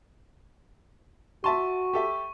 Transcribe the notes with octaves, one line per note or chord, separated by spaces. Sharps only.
F#4 E5 A5 C6 C#6
G4 A4 E5